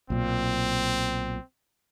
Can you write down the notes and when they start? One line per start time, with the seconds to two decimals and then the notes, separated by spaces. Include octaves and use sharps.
0.10 B1 A#2 C4